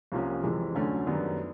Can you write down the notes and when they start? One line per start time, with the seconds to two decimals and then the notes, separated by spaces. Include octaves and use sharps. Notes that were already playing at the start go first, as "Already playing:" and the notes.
0.12 C2 C3 F3 A#3 C#4
0.43 F2 C3 E3 G#3
0.75 D2 D3 F#3 A3 C#4
1.07 F#2 D#3 G3 B3 D4